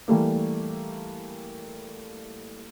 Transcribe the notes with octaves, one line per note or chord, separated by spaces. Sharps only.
E3 G3 A3 A#3